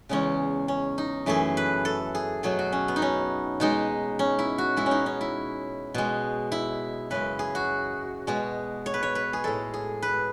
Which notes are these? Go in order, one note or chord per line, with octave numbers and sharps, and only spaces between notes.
E2 C#3 G#3 C#4
C#4
D#4
F#2 E3 A3 G#4
B4
A4
G#4
B2 F#3 A3 G#4
F#4
C#4
B3
D#4
C#4
B2 G#3 D#4
C#4
E4
F#4
B2 G#3 E4
C#4
D#4
C#4
E4
B2 G#3
E4
F#2 C#3 G#3 B4
G#4
F#4
B2 G#3
C#5
B4
C#5
B4
G#4
A2 G#3 A4
G#4
B4